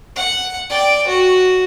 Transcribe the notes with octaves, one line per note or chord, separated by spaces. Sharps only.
F#5
D5 G5
F#4